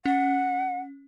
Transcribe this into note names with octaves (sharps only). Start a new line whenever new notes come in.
C#4 F#5